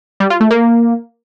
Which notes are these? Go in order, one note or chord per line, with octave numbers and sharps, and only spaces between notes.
G3
F4
A3
A#3